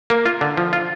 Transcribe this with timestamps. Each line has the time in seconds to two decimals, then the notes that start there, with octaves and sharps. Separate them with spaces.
0.10 A#3
0.26 F4
0.41 D3
0.57 F3
0.73 F4